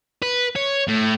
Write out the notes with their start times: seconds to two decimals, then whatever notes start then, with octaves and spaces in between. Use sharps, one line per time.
0.22 B4
0.56 C#5
0.87 A2